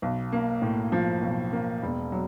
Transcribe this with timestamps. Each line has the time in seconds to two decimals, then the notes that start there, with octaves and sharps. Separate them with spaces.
0.02 B1
0.32 A#3
0.62 A2
0.92 F3
1.22 B1
1.53 A#3
1.83 E1
2.12 F#3